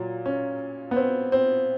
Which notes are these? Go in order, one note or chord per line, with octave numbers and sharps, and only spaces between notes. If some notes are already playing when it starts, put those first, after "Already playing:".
Already playing: A#2 F#3
C#4
B3
C4
C4